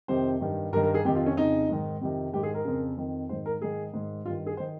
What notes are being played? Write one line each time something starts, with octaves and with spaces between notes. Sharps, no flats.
F2 C3 D#3 C5
G2 D#3
G2 D#3 A#4
A#4
G#4
F2 C3 D#3 G4
F4
C#4
F2 C#3 D#4
G#2 D#3
F2 C3 D#3
G#2 D#3 G4
G#4
A#4
F2 C#3
F2 D#3
G#2 D#3 C5
A#4
G#2 D#3 G#4
G#2 D#3
G2 D#3 F4
G#4
C5
D#3